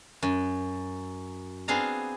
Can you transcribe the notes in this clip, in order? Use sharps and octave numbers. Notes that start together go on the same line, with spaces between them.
F#2
B3 C4 D4 G#4 F5 A#5